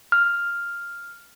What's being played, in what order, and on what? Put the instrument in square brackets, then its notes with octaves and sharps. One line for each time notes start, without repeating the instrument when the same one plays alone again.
[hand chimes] F6